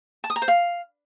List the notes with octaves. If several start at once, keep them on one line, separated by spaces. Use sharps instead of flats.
A5
D#6
A#5
C5
F5